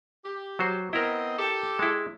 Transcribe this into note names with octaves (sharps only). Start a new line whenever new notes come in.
G4
F#3 F#4 C5
B3 C4 E4 A#4 D#5
G4 A4
G#3 E4